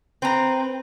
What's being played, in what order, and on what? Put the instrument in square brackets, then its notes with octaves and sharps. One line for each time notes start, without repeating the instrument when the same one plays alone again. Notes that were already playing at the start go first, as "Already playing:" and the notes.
[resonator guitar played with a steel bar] C4 [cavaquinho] B4 A#5